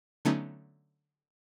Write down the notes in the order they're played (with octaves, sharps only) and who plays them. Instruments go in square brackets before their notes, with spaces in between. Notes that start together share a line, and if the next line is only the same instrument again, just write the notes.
[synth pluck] D3 F#3 A3 B3 C#4 D#4